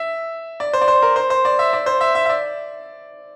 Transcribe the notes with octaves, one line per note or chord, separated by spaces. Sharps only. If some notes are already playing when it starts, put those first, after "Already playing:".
Already playing: E5
D5
C5
D5
C5
A#4
C5
C5
D5
E5
D5
C5
E5
E5
E5
D5